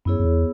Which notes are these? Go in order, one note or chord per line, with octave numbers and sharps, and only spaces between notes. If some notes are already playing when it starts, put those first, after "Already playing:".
F#2 B3 E4 G#4 C#5
F#2
E2